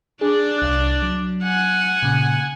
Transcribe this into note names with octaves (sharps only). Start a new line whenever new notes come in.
D4 G#4 D5
C2 F#6
F#3
F#5 G#5
A#2 C#3